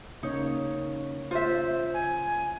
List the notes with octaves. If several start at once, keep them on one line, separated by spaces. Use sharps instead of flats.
C#3 A#3 D#4 C#5
F4 C5 E5
G#5